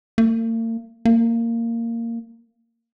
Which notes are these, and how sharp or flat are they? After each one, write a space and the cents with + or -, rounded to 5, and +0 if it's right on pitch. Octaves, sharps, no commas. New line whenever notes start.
A#3 -45
A#3 -15